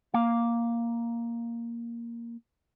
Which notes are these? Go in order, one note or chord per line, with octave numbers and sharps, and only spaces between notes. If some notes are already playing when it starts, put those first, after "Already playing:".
A#3 F5